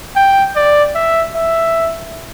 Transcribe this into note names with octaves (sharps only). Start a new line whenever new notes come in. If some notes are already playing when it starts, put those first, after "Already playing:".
G5
D5
E5
E5